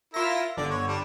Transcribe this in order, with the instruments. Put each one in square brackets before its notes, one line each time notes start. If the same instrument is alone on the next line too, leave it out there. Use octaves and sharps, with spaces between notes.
[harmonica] E4 A#4 E5 [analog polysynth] F4 A#6
[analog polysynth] G1 D3 [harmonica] D5
[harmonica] C#5
G3 D4